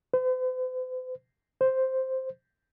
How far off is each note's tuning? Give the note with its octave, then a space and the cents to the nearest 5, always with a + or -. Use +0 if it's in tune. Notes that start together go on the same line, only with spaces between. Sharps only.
C5 -45
C5 +0